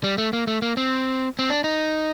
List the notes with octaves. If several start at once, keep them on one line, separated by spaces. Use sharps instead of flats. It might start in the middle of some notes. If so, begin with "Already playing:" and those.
G3
A3
A#3
A3
A#3
C4
C4
D4
D#4